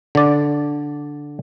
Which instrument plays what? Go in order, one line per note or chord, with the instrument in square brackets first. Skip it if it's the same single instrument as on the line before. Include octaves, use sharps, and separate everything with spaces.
[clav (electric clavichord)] D3 D5